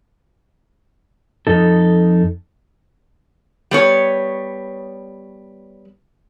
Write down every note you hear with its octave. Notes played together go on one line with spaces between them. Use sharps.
F2 D#4 A4
G3 B3 C#5